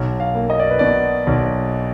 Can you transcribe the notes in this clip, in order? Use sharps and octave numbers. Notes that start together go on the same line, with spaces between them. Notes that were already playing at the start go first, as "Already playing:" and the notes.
Already playing: B1
F5
A#3
D#5
D5
B4
B2 D5
B1